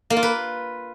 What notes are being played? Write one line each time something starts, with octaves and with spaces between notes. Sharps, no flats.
A#3
F4
B4